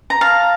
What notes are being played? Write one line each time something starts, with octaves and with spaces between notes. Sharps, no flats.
A#5
F5 A5